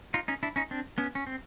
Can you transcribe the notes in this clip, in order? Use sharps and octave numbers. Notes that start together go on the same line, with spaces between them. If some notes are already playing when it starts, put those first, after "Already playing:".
D#4 F4
C#4 D#4
D4 E4
C#4 D#4
C4 D4
B3 C#4
C#4
C4